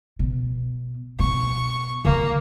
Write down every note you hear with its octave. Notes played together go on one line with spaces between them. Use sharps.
B2
B2 C#6
D3 D#3 A#3